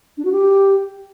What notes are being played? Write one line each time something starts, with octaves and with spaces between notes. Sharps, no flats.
D4
F#4
G4